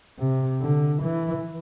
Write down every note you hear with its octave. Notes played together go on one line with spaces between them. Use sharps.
C3
D3
E3